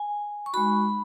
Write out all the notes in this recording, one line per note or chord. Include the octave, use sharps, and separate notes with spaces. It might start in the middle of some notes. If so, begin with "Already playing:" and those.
Already playing: G#5
C#6
G#3 D#4 F#4 B5